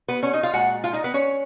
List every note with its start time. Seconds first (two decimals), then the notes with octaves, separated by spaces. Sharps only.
0.08 B3 B4
0.23 C#4 C#5
0.33 D#4 D#5
0.43 F4 F5
0.53 A#2 G#3 F#4 F#5
0.84 F4 F5
0.93 D#4 D#5
1.04 B3 B4
1.14 C#4 C#5